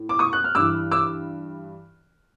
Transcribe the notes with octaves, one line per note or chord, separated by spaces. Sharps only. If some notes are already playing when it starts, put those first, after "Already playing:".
Already playing: A2
D6
C#6 D#6
F#6
F6
G2 E3 D6 E6
D6 E6